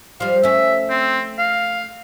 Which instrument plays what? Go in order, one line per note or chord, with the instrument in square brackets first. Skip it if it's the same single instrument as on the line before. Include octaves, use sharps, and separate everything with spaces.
[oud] F3 G3 [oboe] F5
[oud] A3 C#4 [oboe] E5
[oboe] C4
F5